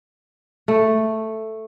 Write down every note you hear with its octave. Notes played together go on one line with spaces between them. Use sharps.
A3